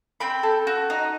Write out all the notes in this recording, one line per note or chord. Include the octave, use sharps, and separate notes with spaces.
C4 G5 B5
A4
F#4
D#4